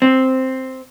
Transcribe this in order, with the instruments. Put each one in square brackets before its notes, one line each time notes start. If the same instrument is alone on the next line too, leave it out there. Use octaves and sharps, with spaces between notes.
[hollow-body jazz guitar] C4